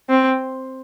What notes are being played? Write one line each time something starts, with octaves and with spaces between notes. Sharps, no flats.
C4